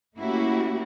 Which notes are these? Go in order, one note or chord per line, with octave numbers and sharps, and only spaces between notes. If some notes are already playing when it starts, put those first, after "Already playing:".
A3 A#3 C#4 E4 F#4 G4